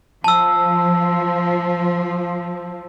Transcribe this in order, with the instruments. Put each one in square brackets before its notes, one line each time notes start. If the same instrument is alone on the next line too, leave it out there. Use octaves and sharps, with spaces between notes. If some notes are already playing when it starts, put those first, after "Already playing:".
[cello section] F3 [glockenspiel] A5 E6